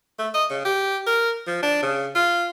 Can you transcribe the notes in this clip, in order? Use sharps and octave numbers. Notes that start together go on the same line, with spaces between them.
A3
D#5
C#3
G4
A#4
F3
D4
C#3
F4